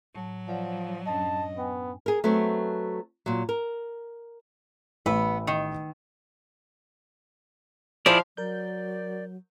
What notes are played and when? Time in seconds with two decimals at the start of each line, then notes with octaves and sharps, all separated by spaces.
0.15 A2 F#3 A5
0.48 F3 C#5 D5 F#5
1.07 F#2 C#4 D4 D#5 A5
1.57 B3 G5 G#5
2.06 G#4 A#4
2.24 F#3 A3 B3 C4
3.26 A#2 F#3
3.49 A#4
5.06 A1 B3 B4 E6
5.47 D#3
8.06 F3 E4 G#4 D5 F5
8.37 F#3 A#4 D5 G6